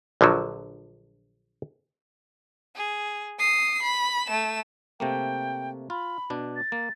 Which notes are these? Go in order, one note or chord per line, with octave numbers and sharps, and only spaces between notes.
A#1 D3 F3 F#3
G#4
D#6 C7
B5
A3 E7
C3 A3 A#3 G5
F4 B5
B2 D4
A6
A#3